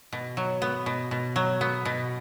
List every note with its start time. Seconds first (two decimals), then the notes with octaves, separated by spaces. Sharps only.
0.13 B2
0.37 F#3
0.62 B3
0.86 B2
1.11 B2
1.36 F#3
1.61 B3
1.85 B2